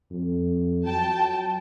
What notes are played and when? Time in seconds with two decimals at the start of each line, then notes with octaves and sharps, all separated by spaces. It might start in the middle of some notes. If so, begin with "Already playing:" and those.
0.11 F2
0.86 F#3 G5 A5